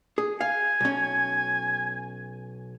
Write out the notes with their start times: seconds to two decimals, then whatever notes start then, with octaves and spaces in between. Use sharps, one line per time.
0.18 G#4
0.41 F5 G#5
0.81 B1 C#4